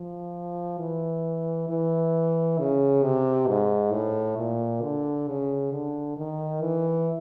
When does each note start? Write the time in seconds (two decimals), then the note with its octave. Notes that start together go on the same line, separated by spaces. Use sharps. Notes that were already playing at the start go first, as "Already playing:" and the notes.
Already playing: F3
0.79 E3
1.69 E3
2.59 C#3
3.03 C3
3.47 G#2
3.92 A2
4.37 A#2
4.82 D3
5.27 C#3
5.72 D3
6.17 D#3
6.61 E3